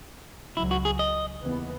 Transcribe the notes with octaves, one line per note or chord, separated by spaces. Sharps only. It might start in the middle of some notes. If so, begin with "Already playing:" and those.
C#2 C#3 F#3 E4
F#4
G#4
D#5
D#2 C#3 E3 B3